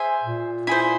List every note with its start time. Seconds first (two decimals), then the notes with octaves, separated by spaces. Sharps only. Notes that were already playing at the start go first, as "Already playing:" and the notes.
Already playing: G#4 C5 E5 G#5
0.23 A#2
0.67 E4 G#4 C5